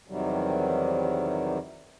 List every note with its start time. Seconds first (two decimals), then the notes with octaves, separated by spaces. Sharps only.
0.08 E2 C3 D#3 F#3 G3